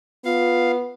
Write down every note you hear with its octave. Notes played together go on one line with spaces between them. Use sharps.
B3 F4 F5